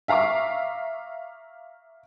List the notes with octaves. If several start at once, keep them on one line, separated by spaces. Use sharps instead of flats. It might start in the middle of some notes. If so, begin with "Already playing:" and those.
E5 F5 A#5 C#6 D6